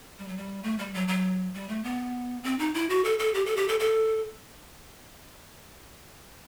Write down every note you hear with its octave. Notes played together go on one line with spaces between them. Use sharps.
G3
F#3
G3
A3
G3
F#3
F#3
G3
A3
B3
C4
D#4
E4
F#4
A4
A4
G4
A4
G4
A4
A4